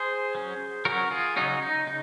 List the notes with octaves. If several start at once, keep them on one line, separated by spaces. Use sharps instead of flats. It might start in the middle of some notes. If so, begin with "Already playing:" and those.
Already playing: G#4 C5
F#3 C#4
F#3 C#4 F#4 A#4
F4 G#4
C#3 F#3 C#4 D#4 F#4
D#4
C#3 D#4